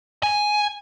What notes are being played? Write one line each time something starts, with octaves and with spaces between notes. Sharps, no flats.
G#5